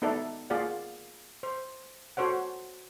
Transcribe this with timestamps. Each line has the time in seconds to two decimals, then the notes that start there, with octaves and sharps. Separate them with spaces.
0.02 B3 D#4 A4 B4 D5 E5
0.50 A#3 F4 G#4 D5 F5 F#5
1.43 C5
2.17 F#4 A4 C5 C#5 F#5